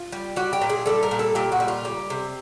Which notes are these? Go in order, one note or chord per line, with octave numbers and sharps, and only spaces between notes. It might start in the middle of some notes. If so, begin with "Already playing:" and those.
Already playing: F4
G3
G3 F#4
G4
A#2
G#4
G3 A4
A#4
A#2
A4
A#2 G4
F#4
G3
F4
G3
C3